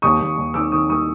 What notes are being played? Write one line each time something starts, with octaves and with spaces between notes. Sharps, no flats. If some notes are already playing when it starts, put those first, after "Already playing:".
D#2 C#6 D#6
D#2
D#2
D#3 D6 E6
D#3 C#6 D#6
D#2 C#6 D#6